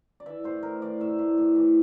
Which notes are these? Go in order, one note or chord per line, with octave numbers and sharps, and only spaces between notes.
D5
E3 E5
A2 C5
A2 A#4
E3 D5
A2 E5
A2
A2 E5
E3